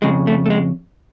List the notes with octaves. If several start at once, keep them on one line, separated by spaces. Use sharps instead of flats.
F2 C#3 G#3
A3
A3
G#3